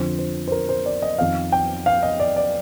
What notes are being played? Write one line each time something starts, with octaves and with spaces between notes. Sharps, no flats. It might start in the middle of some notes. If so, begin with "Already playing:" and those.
Already playing: F2 D3 F3 C5
C5
C5
A#4
C5
D5
D#5
F2 D#3 F5
G5
F5
D#5
D5
D5